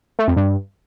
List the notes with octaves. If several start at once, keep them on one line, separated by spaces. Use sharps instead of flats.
A3
F2
G2